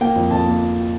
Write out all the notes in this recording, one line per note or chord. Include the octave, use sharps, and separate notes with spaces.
A#3 G5
F2
F2 A5
A#3